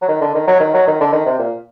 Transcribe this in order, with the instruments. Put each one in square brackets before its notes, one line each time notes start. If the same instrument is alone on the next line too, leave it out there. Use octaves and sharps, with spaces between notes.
[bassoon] F#3
D#3
D3
D#3
F#3
D#3
F#3
D#3
D3
D#3
C3
A#2